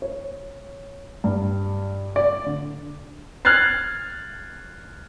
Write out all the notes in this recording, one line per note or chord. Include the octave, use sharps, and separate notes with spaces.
C#5
G2
D5
D3
F6 F#6 G#6 A6 C7